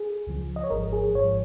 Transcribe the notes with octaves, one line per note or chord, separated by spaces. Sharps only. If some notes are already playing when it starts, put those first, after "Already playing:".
Already playing: G#4
C#2 C#3 F3
D#5
C#5
G#1 G#2 F3 A#4
G#4
G#1 G#2 F3 C#5